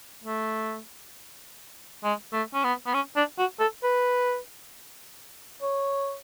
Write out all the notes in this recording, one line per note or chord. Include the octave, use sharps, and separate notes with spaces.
A3
G#3
A3
C#4
B3
B3
C#4
D4
F#4
A4
B4
C#5